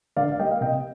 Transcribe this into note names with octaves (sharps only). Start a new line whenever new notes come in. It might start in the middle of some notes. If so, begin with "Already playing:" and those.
D3 D5 F5
F5
G3 A#3 D#5 G5
F5
C3 D#5 G5